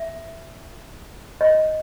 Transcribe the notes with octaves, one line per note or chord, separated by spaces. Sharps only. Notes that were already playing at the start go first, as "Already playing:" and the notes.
Already playing: E5
D#5